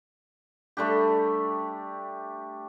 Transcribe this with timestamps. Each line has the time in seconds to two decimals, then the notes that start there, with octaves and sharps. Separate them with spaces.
0.77 G3 A3 D4 G4